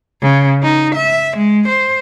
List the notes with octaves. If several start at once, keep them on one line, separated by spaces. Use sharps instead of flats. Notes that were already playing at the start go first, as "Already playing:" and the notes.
C#3
D#4
E5
G#3
C5